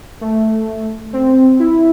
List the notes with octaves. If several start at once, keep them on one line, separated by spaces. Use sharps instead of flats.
A3
C4
E4